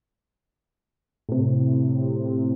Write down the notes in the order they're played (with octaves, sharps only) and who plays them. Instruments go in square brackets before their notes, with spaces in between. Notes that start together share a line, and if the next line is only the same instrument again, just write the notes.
[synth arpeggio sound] A2 C3